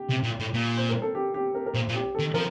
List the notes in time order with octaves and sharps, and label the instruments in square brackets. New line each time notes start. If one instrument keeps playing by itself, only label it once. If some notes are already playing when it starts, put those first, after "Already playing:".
Already playing: [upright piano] G4
[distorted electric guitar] C3
A#2
A2
A#2
[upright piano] C5
A#4
A4
G4
G4
A#4
A#4
[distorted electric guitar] A#2 [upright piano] C5
[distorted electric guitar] A#2
[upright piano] G4
[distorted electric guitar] D#3 [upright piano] A4
[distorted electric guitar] F3 [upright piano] A#4